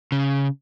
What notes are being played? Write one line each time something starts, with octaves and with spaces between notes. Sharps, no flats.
C#3